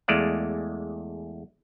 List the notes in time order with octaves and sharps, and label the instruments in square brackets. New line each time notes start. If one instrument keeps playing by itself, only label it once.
[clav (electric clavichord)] E2 G#3 A3 D5 F5